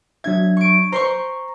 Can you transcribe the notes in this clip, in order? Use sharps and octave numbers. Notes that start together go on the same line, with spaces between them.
F#3 D4 E5 G#6
C#6 D7
C5 A#5 C6 C#6